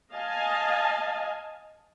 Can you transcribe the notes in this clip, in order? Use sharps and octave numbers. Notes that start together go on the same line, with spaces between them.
D#5 F5 G#5 A5